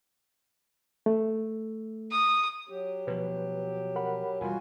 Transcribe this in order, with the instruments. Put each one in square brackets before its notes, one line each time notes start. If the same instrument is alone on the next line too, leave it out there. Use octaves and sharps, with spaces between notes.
[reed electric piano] A3
[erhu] D#6
[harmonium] F#3 G4
[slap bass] B2 F3 [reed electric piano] B4
[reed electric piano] A#4 F#5 B5
[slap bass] E1 G3 [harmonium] F4 F#4 G#5